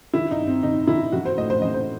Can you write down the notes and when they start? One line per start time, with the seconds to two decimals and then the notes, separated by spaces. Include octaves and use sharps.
0.13 D#3 E4
0.31 D#4
0.39 G2
0.47 C4
0.63 D#3 D#4
0.87 D#3 E4
1.12 E3 F#4
1.25 C5
1.37 A2 D#5
1.50 C5
1.61 E3 D#5
1.74 C5